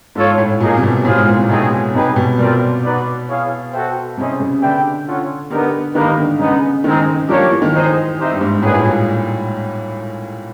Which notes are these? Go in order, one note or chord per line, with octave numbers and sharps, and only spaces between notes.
G#2 F4 A4 C#5
A2
A#2 A#3 D#4 G#4
C3
B2
A2 F4 G#4 C5 F5
G#2
A#2
C3
B2 A3 C4 D#4 G#4
C3 D#4 G#4 B4 D#5 G5
B2
B2 G3 C4 F4 A#4 D5
D#4 F#4 B4 D5
E4 G#4 C#5 F5
F#4 A4 C5 E5 G5
C3 C#4 E4 G#4 C5 D#5
C#3
D3 D4 G4 B4 E5 G5
C#4 F4 A4 C#5 F#5
D3 B3 D#4 G4 A#4
D#3 A#3 D#4 G4 B4
D3
C#3 G#3 B3 D#4
D#3 G#3 C4 D#4
F3 A#3 D4 G4 A#4 C#5
F3
E3
D#3
D#4 G#4 C5 D#5
C4 D#4 G4 C5 E5
G2
G#2
A2 A#3 D#4 G#4 B4 D5
A2
A#2